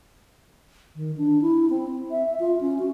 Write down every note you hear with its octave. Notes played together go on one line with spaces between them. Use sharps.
D#3
D4
E4
C4
E5
F4
C#4
F#4